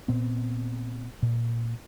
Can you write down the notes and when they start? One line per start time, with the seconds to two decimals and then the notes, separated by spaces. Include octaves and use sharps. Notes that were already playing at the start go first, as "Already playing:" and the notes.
0.08 A#2 B3 C4
1.23 A#2